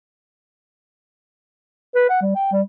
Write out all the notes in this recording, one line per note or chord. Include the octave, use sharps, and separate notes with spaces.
B4
F#5
G3
G5
G3